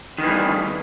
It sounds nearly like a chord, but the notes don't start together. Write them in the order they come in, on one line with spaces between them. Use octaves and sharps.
D#3 E3 G2